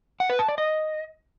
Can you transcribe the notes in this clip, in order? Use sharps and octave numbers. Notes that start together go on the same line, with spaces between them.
F#5
B4
A5
D5
D#5